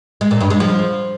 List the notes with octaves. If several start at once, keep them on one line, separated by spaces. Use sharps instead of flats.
G#3
A#2
G2
G#3
F3